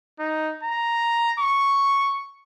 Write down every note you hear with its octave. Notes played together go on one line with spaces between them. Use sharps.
D#4
A#5
C#6